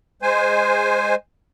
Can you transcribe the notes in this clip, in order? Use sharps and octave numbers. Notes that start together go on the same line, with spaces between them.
G#3 C5 G#5